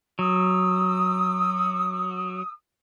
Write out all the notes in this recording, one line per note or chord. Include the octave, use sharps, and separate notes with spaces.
F#3 D#6 E6